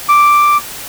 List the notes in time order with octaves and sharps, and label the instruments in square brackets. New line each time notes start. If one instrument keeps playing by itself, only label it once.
[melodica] D6